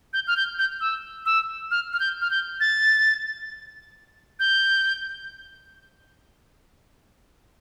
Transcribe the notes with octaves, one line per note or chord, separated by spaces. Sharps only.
G6
F6
G6
G6
E6
E6
F6
F6
G6
F6
G6
A6
G6